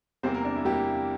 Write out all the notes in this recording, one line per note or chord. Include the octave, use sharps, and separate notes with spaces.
E2 C3 G3 A#3 C4 C5
A#3 A#4
D4
E4
E2 C3 G3 A#3 G4